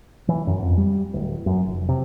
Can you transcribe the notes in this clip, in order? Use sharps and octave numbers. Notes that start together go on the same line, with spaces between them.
E3
F#2
F2
G3
D1
F#2
F1
C3